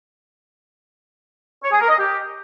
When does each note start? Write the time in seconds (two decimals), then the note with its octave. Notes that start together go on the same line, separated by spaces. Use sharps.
1.63 C#5
1.72 G#4
1.81 A#4
1.89 D#5
1.98 G4